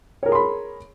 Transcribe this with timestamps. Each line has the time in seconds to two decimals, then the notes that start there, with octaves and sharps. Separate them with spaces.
0.23 C#5
0.26 A#4
0.29 G#4
0.32 C6
0.35 B5